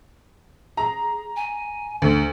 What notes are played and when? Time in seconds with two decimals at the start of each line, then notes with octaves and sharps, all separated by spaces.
0.77 G#4 A#5
1.36 G#5
2.02 D2